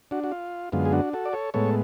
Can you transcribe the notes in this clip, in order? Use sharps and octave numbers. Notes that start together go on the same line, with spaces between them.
D4 F#4
F#4
F4
F#2 D3 G#3 B3 F4
G#4
D4 F#4
F#4 A4
D5
A4 C#5
A2 G#3 B3 A4 C#5